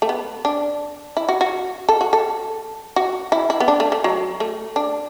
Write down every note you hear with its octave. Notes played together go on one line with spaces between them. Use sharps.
A3
B3
D4
E4
F#4
F#4
A4
F#4
A4
F#4
E4
E4
B3
D4
A3
A3
F#3
A3
D4